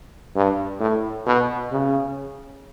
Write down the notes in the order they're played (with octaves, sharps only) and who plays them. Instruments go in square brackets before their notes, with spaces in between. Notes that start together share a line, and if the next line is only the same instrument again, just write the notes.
[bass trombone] G2
A2
B2
C#3